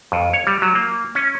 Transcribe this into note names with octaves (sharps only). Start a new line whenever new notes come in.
F2
C#5
G3
F#3
A#3
C#4